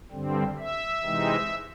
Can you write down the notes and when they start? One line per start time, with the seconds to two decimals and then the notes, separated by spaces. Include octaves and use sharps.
0.11 G2 D3 G3 C4
0.58 E5
1.03 C3 E3 G#3 C4 D#4